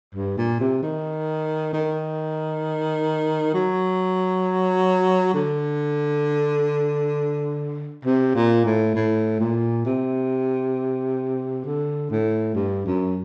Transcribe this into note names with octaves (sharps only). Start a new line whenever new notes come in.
G2
A#2
C3
D#3
D#3
F#3
D3
C3
A#2
A2
A2
A#2
C3
D3
A2
G2
F#2